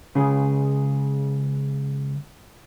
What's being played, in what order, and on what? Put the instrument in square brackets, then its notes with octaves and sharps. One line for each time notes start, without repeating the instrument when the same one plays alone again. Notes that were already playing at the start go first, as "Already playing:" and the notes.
[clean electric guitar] C#2 C#3 G#4